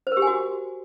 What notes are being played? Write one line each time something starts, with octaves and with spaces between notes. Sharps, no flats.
C5
A#4
G4
G#5
F#4